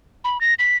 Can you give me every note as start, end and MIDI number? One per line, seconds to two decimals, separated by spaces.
0.24 0.40 83
0.41 0.54 94
0.59 0.77 95